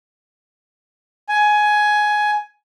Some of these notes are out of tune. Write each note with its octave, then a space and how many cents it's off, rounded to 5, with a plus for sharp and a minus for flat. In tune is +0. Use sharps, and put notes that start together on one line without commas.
G#5 +15